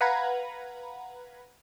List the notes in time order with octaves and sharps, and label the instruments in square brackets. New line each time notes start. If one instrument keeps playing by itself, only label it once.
[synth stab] B4 F5 F#5 A#5 B5 G#6